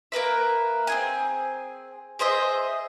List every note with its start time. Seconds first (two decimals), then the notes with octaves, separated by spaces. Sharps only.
0.12 A#3 A#4 B4 E5
0.87 C4 G#4 G#5
2.19 G#4 C5 D#5 E5